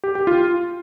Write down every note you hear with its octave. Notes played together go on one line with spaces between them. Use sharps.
G4
G4
F4